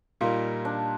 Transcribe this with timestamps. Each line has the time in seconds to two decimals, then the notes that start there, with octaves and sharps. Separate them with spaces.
0.21 A#2 G3 A#3 D#4 F4
0.65 D4